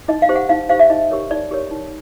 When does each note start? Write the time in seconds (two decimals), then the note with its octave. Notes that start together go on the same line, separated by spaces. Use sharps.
0.08 D#4 D#5
0.22 F5
0.29 G4 C5
0.36 F#5
0.49 D#4 F5
0.69 G4 C5 F5
0.79 E5
0.90 D#4 D#5
1.11 G4 A#4 C#5
1.31 D#4 D5
1.51 G4 A#4 C#5
1.71 D#4